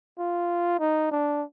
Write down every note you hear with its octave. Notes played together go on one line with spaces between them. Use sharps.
F4
D#4
D4